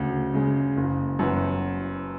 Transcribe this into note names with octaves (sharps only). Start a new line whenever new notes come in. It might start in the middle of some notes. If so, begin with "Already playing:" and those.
Already playing: D2 C#3
C#3 G#3
F#1
F#2 E3 B3